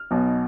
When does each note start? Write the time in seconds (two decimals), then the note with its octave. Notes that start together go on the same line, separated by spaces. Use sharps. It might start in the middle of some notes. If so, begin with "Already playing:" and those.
Already playing: F6
0.11 B1 B2 B3 D#4